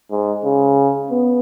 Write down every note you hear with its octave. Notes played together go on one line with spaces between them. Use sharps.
G#2
C#3
B3